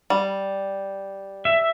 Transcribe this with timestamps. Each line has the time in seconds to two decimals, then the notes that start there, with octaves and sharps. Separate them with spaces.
0.10 G3
1.45 E5